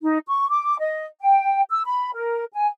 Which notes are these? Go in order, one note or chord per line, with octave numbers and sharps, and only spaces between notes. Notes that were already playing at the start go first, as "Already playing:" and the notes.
D#4
C#6
D6
D#5
G5
E6
B5
A#4
G#5